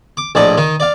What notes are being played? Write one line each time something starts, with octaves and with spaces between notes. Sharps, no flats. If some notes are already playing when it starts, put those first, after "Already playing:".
D6
A#1 A2 D5 D#5 A5
D#3 D#4
D5 F5